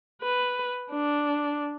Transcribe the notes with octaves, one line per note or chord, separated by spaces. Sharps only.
B4
D4